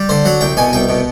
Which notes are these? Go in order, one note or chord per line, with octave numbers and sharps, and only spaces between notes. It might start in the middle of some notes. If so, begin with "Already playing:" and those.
Already playing: G3
D3 C5
F#3 F#5
C2 G5
B2 G#5
C2 G5
B2